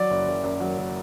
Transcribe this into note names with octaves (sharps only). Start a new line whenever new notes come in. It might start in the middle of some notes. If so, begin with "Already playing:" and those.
Already playing: F#3 D5
F#1
F#1
F#2
F#3
F#1